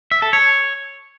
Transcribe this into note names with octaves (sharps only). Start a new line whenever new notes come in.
E5
A4
C#5